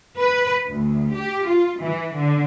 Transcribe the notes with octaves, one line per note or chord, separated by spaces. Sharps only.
B4
D2
G4
F4
E3
D3